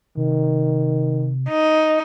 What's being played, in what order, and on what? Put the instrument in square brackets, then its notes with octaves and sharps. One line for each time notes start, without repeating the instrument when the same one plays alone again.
[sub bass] C3 [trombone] D#3
[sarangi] D#4